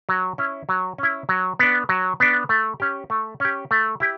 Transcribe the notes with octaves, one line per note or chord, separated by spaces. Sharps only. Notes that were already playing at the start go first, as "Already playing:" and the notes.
F#3
C#4 E4
F#3
C#4 E4
F#3
B3 D4
F#3
B3 D4
A3
C#4 G4
A3
C#4 G4
A3
E4 G4